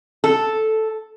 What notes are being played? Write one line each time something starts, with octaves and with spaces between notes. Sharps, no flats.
A4